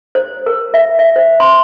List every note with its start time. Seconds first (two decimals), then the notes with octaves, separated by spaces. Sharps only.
0.15 C5
0.46 A#4
0.74 E5
0.99 E5
1.16 C5
1.40 C6